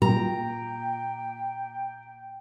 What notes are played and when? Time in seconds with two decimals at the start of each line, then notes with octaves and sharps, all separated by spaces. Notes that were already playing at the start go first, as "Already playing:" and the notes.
0.02 A#2 G5 A#5